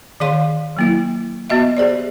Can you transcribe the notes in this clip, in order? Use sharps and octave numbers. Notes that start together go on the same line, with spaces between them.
D#3 G#4 C#5 F5 C6
F#3 A#3 E4
B3 F#4 D#5 E5
G4 G#4 C5 D5